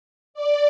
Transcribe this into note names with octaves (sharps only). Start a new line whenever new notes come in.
D5